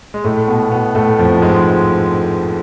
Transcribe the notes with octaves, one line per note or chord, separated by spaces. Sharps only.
G#3
A2 A3
B2 B3
B2 B3
A2 A3
F2 F3
G#2 G#3